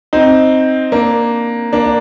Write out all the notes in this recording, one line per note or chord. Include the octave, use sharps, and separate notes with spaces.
C4 D#4
A#3 D4
A#3 D4
D4